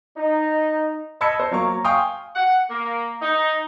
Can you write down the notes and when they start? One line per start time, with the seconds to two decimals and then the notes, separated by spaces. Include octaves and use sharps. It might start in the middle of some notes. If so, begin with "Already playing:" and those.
0.16 D#4
1.21 D#5 A5 B5 E6 G#6 C#7
1.40 C5
1.51 F#3 A#3 F5 C#6
1.85 F5 G5 G#5 C6 C#6 D#6
2.36 F#5
2.70 A#3
3.22 D#4